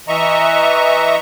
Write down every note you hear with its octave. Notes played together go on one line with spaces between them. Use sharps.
E3 D#5 E5 A#5 C#6